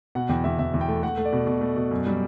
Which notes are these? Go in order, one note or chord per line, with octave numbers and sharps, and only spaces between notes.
B2 F#5
E2 G5
E2 E5
E2 E5
E2
G5
A3
A3 F#5
A3
D5
B2
B2
A3
B2
F#2
G3